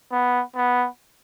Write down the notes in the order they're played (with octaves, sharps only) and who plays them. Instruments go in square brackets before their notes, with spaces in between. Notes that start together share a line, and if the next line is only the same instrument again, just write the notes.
[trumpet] B3
B3